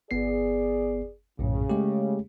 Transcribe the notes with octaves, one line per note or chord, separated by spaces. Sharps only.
G1 B3 G#4 D5 C7
A#1 F#2 A2 C#3
G#3 A3 G4